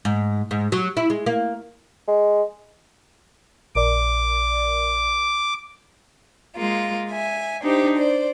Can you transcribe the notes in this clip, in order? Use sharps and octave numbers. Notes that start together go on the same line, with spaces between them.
G#2
G#2
F#3
E4
G#3
A#3
G#3
A#1 A#4 D5 D6
G#3 A#3 F4
E5 G#5
D4 D#4 G4 C5
C5 D5